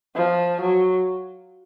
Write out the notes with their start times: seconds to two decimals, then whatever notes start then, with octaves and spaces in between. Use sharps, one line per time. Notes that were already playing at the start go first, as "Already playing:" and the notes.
0.16 F3
0.61 F#3